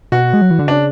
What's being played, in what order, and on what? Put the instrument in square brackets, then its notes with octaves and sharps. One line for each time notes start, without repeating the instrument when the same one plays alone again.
[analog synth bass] B2 [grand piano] F#4
[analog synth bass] G#3
F#3
E3
D3
[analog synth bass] C#3 [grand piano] D4